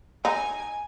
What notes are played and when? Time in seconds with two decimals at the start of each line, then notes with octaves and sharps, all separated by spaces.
0.25 D#4 G#5